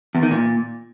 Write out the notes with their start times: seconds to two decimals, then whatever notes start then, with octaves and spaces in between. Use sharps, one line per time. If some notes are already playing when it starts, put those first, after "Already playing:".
0.15 E2
0.23 D#3
0.31 A#2